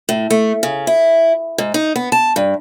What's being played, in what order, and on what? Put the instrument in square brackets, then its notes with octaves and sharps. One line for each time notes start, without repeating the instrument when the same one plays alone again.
[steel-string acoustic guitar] A2
A3
C#3
E4
G#2
D#4
B3
A5
G2